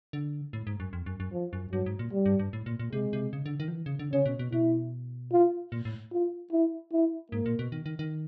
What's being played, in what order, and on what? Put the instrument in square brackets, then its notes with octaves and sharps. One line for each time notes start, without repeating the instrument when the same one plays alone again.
[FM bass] D3
A2
G#2
F#2
F2
F#2
F#2
[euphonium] F3
[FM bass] F#2
[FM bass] G2 [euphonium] F#3
[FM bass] G#2
A#2
[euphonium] G3
[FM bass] G2
G2
A2
A#2
A#2
[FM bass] C3 [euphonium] G#3
[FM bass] C3
C#3
D3
D#3
F3
E3
C#3
D3
[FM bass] C#3 [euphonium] C#4
[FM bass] B2
B2
[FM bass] B2 [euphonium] E4
[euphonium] F4
[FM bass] A#2
A2
[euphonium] F4
E4
E4
[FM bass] G#2 [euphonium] A#3
[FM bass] A#2
B2
D#3
D#3
D#3